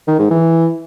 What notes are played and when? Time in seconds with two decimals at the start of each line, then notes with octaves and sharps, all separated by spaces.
0.07 D#3
0.19 G#2
0.30 E3